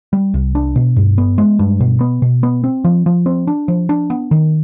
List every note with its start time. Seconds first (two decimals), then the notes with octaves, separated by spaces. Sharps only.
0.13 G3
0.34 C2
0.55 D4
0.76 B2
0.96 G2
1.18 B3
1.38 G#3
1.59 G2
1.80 B2
2.01 B3
2.22 B2
2.43 B3
2.64 C4
2.84 F3
3.06 F3
3.26 C4
3.47 D4
3.68 F3
3.89 D4
4.10 B3
4.31 D#3